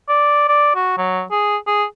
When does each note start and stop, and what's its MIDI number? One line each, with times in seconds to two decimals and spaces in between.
0.09 0.48 74
0.48 0.71 74
0.75 0.93 66
0.98 1.22 54
1.31 1.57 68
1.67 1.84 68